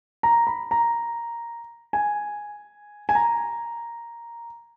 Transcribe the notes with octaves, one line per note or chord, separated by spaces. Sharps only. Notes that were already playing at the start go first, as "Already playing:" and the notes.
A#5
B5
A#5
G#5
G#5
A#5